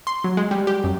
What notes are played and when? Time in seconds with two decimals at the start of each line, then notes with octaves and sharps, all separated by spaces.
0.07 C6
0.24 F#3
0.37 G#3
0.51 G3
0.67 G4
0.84 F#2